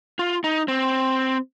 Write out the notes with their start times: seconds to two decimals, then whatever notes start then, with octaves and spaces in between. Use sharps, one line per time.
0.19 F4
0.44 D#4
0.68 C4